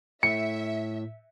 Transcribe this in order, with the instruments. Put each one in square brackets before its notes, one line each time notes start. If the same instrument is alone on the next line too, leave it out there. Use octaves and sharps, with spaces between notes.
[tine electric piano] A2 [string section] E5 [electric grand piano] C#7